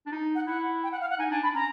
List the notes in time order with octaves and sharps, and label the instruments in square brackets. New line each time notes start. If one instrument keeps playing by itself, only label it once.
[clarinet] D4
D#4
[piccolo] F#5
[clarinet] E4 [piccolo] F#5
[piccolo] G5
F#5
F5
F#5
[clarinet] D#4 [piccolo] G#5
[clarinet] D4 [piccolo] G#5
[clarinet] D4 [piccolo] B5
[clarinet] C#4 [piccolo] A#5